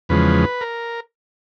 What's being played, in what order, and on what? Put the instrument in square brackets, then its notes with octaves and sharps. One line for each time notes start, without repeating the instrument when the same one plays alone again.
[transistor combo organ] E2 C#3 F3 G#3 B4
A#4